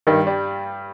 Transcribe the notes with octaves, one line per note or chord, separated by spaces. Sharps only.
G2 D#3
G3